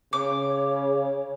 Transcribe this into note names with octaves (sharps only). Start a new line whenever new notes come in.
C#3 C#5 D6